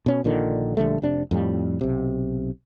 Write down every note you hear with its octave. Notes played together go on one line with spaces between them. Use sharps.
B2 C#4
A#1 A#2 D3 D#3
A#1 D3 G3 A3
F1 C3 D4
F2 A2 G3
B1 C3